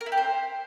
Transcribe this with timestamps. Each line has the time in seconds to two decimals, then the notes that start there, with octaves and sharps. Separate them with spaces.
0.01 A#4
0.06 E4
0.12 G4
0.17 C5